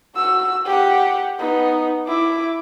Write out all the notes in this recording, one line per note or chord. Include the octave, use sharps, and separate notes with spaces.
F#4 E6
G4 F#5
B3 D#4
E4 D6